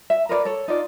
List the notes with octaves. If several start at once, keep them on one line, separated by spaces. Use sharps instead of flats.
E5
A#4 B4 C#5 D5
A4 C#5
D#4 F4 D5